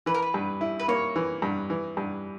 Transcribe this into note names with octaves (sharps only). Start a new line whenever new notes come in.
E3 B4
A#4
B4
G2
E4
B4
A#3 C#5
E3
G2
E3
G2